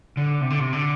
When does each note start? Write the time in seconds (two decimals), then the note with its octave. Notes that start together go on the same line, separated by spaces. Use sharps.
0.17 D3
0.41 C3
0.50 D3
0.60 C3
0.73 D3